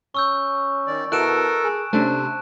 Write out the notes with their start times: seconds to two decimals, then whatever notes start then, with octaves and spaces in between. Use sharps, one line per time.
0.15 C#4 C#6 E6 G6
0.87 D#3 D5
1.12 B2 E4 F#4 A4 A#4 F#6 D7 E7
1.64 G#4
1.93 C3 A3 C#4 D4 C5 A5 F#6